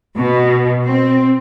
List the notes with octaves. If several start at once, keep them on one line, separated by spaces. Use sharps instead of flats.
B2
C4